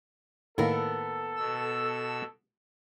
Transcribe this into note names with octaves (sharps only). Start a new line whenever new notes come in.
A2 D#3 A#3 B3 A4 A#4
B2 E6